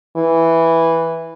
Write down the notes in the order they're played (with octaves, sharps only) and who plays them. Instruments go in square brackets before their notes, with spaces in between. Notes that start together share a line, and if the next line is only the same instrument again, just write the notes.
[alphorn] E3